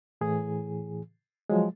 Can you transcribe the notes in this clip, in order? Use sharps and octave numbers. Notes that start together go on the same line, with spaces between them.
A2 E3 G#4
F3 F#3 G#3